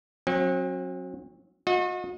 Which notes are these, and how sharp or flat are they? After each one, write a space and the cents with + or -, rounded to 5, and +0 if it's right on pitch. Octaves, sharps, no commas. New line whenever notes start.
F#3 -20 C4 +45
F#4 -40 D#5 +15